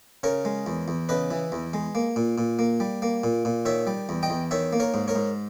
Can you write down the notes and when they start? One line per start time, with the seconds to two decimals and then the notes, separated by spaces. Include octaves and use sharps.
0.23 C#3 A#4 C#5
0.45 G#3
0.66 E2
0.88 E2
1.09 C#3 B4 D#5
1.31 E3
1.52 E2
1.73 G#3
1.95 A#3
2.16 A#2
2.38 A#2
2.59 A#3
2.80 G3
3.02 A#3
3.24 A#2
3.45 A#2
3.65 D#3 C#5 E5
3.87 G3
4.09 E2
4.23 D#5 G5
4.30 E2
4.51 D#3 C#5 E5
4.73 A#3
4.80 A#4 C#5
4.94 G#2
5.08 A#4 C#5
5.15 G#2